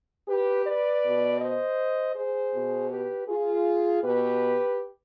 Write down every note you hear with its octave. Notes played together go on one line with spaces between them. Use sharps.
G4 B4
B4 D5
B2
C5 D#5
G#4 C5
B2
G4 B4
F4 G#4
B2 G4 B4